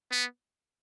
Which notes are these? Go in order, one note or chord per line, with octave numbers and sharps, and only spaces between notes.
B3